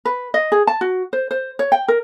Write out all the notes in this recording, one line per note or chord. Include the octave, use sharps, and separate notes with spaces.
B4
D#5
G#4
A5
F#4
C5
C5
C#5
G5
A#4